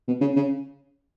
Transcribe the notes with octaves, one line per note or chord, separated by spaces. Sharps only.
B2
C#3
C#3